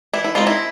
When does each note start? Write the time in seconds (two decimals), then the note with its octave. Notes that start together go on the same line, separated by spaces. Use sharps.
0.14 E3 E4
0.24 E4
0.35 G#3 C4 D#4 F4
0.47 E4